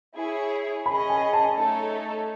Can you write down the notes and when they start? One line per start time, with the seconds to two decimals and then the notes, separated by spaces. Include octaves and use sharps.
0.15 E4 G#4 C#5
0.86 C#4 G#4 D#5 B5
1.10 G#5
1.33 A5
1.57 A3 D#4 A4 C#5